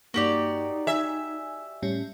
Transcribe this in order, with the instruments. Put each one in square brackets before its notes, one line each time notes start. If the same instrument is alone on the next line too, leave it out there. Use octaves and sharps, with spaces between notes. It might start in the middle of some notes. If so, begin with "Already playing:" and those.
[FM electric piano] G2 A#3 [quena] D#4 [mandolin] F#4 G4 D5
[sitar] E5 [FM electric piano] G#5
[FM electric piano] A2 G3 C#4